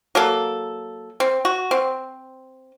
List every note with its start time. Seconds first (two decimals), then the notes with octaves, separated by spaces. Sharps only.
0.15 F#3 A#3 A4
1.20 C4
1.45 F#4
1.71 C4